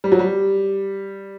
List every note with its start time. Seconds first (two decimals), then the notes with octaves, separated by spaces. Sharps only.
0.04 G3
0.12 F#3
0.19 G3